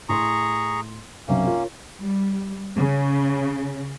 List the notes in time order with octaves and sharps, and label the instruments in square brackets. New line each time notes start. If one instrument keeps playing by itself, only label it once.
[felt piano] A2 C6 [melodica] G#4 A#5 C#6
[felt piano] B1 F#2 C3 [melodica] A#3 C#4
[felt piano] F4 A#4 C#5
[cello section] G3
C#3